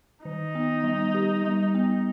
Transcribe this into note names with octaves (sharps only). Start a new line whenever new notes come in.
D#3 D#4
B3
G3
G4
G3
B3